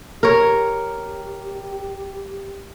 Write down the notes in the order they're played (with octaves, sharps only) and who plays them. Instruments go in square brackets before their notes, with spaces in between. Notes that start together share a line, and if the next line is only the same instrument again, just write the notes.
[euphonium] G4 [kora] A#4 C#5